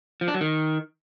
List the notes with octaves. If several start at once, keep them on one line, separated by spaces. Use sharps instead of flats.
F3
D4
F#3
D#3